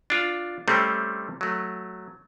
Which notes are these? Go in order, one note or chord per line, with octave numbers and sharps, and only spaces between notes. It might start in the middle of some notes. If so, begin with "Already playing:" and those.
D4 F4
C3 G3 A3 C4 C#4
F#3 A3